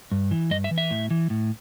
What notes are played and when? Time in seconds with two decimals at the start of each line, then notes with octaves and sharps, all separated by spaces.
0.12 G2
0.31 E3
0.51 G2 D#5
0.64 E5
0.71 E3
0.78 E5
0.90 A2
1.11 E3
1.30 A2